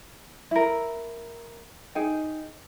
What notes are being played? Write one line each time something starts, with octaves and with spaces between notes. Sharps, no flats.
E4 A#4
D#4 G#4 G5